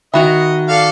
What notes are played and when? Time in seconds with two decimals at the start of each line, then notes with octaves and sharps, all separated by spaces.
0.14 D#3 F#4 D#5 E5 G5 A#5 B5
0.69 A4 D5 F5